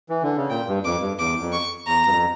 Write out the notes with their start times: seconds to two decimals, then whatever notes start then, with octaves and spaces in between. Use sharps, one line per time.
0.09 E3
0.23 D3
0.36 C#3
0.50 A#2 G5
0.67 G2
0.84 F2 D6
1.01 G2
1.19 E2 D6
1.41 F2
1.52 C#6
1.87 E2 A#5
2.05 G2
2.10 F2